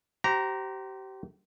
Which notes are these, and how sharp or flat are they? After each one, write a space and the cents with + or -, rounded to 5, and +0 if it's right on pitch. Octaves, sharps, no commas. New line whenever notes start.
G4 -35 C5 +0 A#5 +0